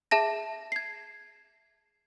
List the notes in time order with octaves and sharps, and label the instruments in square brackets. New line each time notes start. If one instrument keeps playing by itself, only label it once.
[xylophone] G#4 E5 A5 A#6
G#6 C7